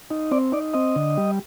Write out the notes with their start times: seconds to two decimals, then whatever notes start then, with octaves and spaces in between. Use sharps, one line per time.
0.11 D#4
0.31 C4 D5
0.52 D#4 D5
0.74 C4 D#5
0.96 D3
1.17 G3